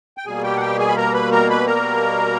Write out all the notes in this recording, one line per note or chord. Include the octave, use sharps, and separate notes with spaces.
G5
B2 G3 A#3 G#4 G#5
G4 G5
F#5
G4 G5
G#4 G#5
B5
A#4 A#5
B4 B5
A#4 A#5
B4 B5
A#4 A#5